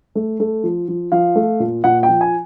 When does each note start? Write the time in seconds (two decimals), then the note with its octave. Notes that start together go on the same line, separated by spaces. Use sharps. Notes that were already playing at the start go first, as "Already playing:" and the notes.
0.15 A3
0.40 A3
0.64 F3
0.88 F3
1.12 F3 F5
1.35 A3
1.60 A#2
1.84 A#2 F#5
2.03 G5
2.09 F3
2.21 G#5